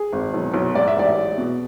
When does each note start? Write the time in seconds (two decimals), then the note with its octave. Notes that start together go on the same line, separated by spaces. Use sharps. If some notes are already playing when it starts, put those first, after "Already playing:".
Already playing: G#4
0.13 G#1
0.34 B1
0.54 B1
0.75 G#2 D5
0.88 E5
0.96 A1 D5
1.17 G#3
1.38 B2